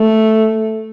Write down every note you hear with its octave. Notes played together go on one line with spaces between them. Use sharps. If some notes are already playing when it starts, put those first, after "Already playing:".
Already playing: A3